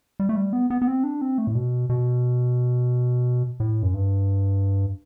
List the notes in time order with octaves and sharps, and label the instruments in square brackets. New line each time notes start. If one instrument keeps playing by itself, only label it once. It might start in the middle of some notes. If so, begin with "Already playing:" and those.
[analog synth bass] G3
A3
G3
B3
B3
B3
C4
D4
C4
A3
A2
B2
B2
A2
F#2
G2